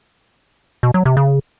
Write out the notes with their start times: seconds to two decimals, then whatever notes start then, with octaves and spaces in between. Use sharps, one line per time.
0.83 B2
0.94 F#3
1.05 C3
1.17 C#3